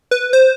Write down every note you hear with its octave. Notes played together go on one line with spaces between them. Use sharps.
B4
C5